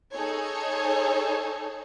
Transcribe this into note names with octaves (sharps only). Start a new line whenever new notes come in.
D#4 G#4 A4 C#5